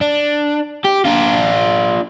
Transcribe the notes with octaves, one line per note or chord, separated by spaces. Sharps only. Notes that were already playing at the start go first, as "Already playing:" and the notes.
D4
G4
D4 F4